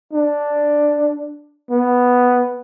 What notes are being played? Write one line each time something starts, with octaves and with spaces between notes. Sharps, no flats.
D4
B3